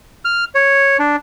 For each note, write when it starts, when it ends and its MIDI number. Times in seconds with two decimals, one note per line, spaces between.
0.25 0.44 89
0.55 0.97 73
0.99 1.16 62